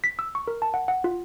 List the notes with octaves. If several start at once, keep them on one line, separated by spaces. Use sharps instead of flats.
B6
E6
C#6
A#4
A5
F#5
F#5
F4